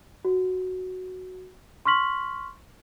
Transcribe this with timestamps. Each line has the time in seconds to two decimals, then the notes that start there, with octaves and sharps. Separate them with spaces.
0.25 F#4
1.85 C6 C#6 F6 B6 F#7